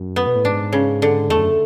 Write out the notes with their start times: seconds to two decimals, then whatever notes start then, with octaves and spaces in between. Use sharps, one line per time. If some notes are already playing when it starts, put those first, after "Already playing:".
Already playing: F#2
0.16 B3
0.27 B2
0.35 A2
0.45 G#2 D4
0.73 C#3
1.02 D3
1.29 E2 A3
1.39 F#2